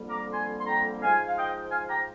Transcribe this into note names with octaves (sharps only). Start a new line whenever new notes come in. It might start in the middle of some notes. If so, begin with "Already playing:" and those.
Already playing: F2 D3 G3 A#3
A#5 D6
G#5 C6
C6
G5 A#5
G#2 F3 G#3 F5 G#5
F5
D#5 G5
F5 G#5
G5 A#5